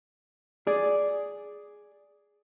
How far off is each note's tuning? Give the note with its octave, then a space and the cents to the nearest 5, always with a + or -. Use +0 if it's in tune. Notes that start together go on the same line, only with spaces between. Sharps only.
G#4 +0 D5 -5